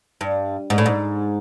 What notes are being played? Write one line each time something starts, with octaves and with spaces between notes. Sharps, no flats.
G2
G#2
A2
G#2